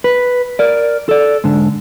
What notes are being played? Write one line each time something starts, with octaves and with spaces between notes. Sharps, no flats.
B4
A#4 D5
A4 D5
G#2 D3